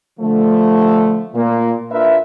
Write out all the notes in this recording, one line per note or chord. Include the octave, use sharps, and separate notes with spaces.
D3 F3 A3
A#2 A#3
D4 F4 A#4 B4 E5